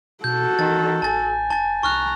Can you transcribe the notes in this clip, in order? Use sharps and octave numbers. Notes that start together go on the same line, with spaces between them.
B2 F#4 A4 G6
D#3 E3 A6
A1 G#5 A5 A6
F1 A5 A6
C2 A#5 C#6 F6 F#6